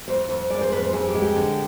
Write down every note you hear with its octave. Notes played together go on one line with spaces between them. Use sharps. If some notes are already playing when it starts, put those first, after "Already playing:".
F2 C5
F2
G#3 D5
C5
F2 B4
C5
F2 G#4
G4
G#3
G4
D3